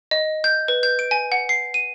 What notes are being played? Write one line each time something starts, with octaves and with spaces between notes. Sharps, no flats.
D#5
G6
B4
G6
D7
G#5
F#5
C7
D#7